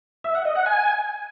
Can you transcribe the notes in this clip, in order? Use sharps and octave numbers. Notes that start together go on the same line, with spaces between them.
E5
F#5
D#5
F#5
G#5